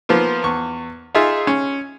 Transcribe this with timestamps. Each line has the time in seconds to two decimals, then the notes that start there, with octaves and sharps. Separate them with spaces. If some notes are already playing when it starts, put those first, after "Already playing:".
0.09 F3 A#3 B3 F4
0.44 E2 C#6
1.15 D#4 F4 G#4 E5
1.47 C#4